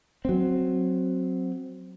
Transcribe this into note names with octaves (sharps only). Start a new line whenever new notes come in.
F#3 C4